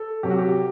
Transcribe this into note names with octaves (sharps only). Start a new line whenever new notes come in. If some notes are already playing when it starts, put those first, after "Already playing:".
Already playing: A4
C3 F#3 G4
F#4
G4